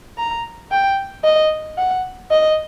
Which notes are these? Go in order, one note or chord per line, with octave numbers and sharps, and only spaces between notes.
A#5
G5
D#5
F#5
D#5